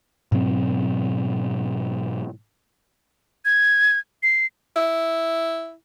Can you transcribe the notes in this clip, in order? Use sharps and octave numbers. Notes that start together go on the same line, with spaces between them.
G#2 B2 F#3 C4
G#6
C7
E4